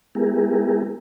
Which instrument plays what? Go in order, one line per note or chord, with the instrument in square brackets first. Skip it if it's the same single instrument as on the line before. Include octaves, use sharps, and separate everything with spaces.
[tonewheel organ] G#3 B3 E4 G4 G#4 A#4